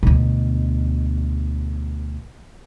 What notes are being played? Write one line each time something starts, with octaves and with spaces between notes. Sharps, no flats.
D2 B2